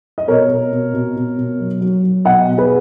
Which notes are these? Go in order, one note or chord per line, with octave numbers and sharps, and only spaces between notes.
D#5
B2 A#4 C#5
B2
B2
B2
B2
B2
F#3
F#3
F#3
B2 D#5 F#5
B2
G#4 B4